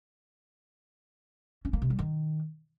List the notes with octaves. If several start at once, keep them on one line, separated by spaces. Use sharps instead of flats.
C#4
A#3
C3
G3
D#3